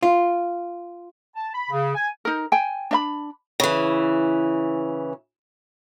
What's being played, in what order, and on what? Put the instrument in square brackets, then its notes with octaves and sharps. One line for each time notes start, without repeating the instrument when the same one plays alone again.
[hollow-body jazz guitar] F4
[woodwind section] A5
B5
C#3
G#5
[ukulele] D#4 A#4
G5 G#5
D4 D#5 B5
[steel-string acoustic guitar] C#3 E3